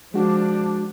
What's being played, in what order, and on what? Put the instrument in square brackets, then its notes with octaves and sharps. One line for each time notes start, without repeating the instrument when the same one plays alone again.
[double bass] F3 [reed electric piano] G#3 F#4 [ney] D4